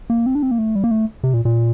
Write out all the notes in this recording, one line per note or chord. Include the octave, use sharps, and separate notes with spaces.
A#3
C4
D4
C4
A#3
A3
G3
A#3
A3
C3
A#2
A#2